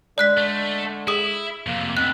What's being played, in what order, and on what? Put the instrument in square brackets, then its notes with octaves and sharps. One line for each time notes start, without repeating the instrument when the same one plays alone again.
[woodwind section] D3 G#3 [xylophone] D5 F#6 B6
[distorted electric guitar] A3
[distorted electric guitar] E4 [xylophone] G#4 D#6
[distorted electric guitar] F2 C3 [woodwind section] A#3
[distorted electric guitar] D2 B3 [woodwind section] D#3 C4 [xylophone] F#6